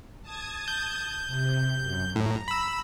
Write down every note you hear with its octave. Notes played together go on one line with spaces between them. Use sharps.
A5 D#6 G#6
G6
C3
F#2
A2 A#5
B5 E6